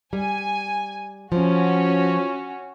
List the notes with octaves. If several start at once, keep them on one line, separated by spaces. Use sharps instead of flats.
G3 G#5
F3 C#4 F#4